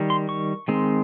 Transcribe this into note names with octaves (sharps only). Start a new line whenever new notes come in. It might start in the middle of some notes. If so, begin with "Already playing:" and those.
Already playing: D#3 G3
C6
C#6
D#3 G#3 C4